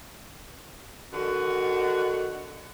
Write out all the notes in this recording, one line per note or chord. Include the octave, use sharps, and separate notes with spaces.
D3 D#3 F#4